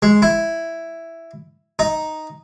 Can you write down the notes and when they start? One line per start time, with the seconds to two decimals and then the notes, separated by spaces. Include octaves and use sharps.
0.02 G#3
0.22 E4
1.79 D#4